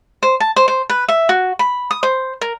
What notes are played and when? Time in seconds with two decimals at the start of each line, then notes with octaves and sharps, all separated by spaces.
0.23 C5
0.40 A5
0.56 C5
0.68 C5
0.90 B4
1.08 E5
1.29 F#4
1.59 B5
1.91 D#6
2.03 C5
2.41 A#4